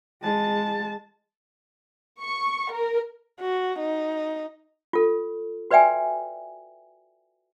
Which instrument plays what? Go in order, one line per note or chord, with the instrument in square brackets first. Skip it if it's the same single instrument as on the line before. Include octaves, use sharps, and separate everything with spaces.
[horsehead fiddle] G#3 A5
[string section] C#6
A#4
[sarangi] F#4
D#4
[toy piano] F4 A4
F#4 B4 D5 E5 G5 G#5